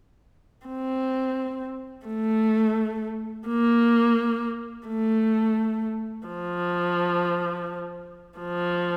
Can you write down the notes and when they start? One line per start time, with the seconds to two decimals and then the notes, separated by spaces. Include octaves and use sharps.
0.67 C4
2.07 A3
3.47 A#3
4.88 A3
6.28 F3
8.39 F3